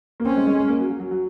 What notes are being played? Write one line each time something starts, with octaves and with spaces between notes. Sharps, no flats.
A#3
C4 C#4
G#3
G#3
A#3
F#3
F#3
F#3
F#3